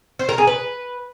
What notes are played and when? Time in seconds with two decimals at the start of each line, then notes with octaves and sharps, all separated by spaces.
0.19 C5
0.29 A#4
0.38 G#4
0.47 B4